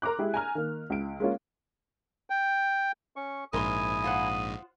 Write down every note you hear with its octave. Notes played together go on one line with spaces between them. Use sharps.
A#4 A#5 C6 D6 F#6
G#3 E4 G4 G#4
G#5 A#5 F6
D#3 A#3
C#2 D7
G#3 A#3 C#4 F4
G5
C#4 C#6
A#1 G#2 E4 A#4 G#5 C6 D#6
F4 C5 F#5